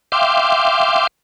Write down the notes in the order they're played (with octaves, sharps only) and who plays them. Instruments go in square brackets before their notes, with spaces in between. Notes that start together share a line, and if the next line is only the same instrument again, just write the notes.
[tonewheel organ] E5 F5 G5 C6 D6